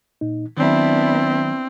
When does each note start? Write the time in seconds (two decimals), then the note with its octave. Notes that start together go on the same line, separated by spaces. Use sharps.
0.21 A#2 D#4
0.57 D#3 F#3 B3 C4 D4 E4